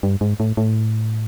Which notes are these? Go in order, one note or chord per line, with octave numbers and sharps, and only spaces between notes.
G2
G#2
A2
A2